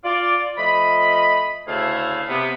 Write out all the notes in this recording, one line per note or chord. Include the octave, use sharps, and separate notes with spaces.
F4 D5
F3 A3 D#5 B5
D2 C#3 A3 E4 G#4 F5
C3 B3